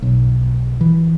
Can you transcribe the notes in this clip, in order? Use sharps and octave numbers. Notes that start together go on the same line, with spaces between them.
B1
E3